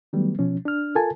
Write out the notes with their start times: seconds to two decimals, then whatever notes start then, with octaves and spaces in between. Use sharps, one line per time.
0.13 D#3 F#3 G3 A3 B3
0.39 B2 F3 C#4
0.65 D4 F6
0.95 F4 A4 A#4 G#5 A5